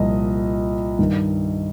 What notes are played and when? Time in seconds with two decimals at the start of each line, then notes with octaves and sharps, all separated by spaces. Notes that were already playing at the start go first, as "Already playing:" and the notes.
Already playing: C2 A#2 F3 D#5
0.99 G2 D#3